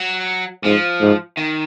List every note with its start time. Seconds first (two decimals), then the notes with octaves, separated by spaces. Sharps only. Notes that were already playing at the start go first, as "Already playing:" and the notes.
Already playing: F#3
0.64 G#2 F3
1.01 G#2
1.37 D#3